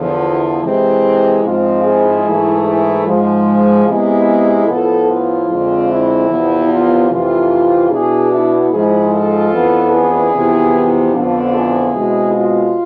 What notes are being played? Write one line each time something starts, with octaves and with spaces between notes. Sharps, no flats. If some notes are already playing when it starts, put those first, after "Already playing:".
Already playing: E2 D3 F3
E4
C3 E3 G#3 C4
G#2 F3 G#3 C4 F4
E4 G#4
G#2 E3 A3
E4 G#4
G#2 F3 G#3
C3 G#3 B3 E4 G#4
A2 F3 B3 F4 A4
F4
F2 D3 G#3 C4
E4
E2 C3 F3 B3
F4
F2 C3 E3 A3 F4
B2 B3 D4 E4 G#4
E4
G#2 F3 G#3 E4 G#4
F4 A4
F2 E3 B3 D4
E4 G#4
F2 C3 E3 B3
F2 D3 F3 B3 D4 F4
E4 G#4
B2 G#3 C4
F4